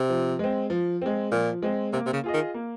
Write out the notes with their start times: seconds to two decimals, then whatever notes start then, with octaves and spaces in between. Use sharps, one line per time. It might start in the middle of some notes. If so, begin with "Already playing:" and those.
Already playing: C3
0.09 F3
0.39 G#3 C4
0.70 F3
1.02 G#3 C4
1.32 A#2 F3
1.62 G#3 C4
1.93 C3 A#3
2.06 C3
2.13 C#3
2.24 F4 G#4 D#5
2.34 D#3
2.54 A#3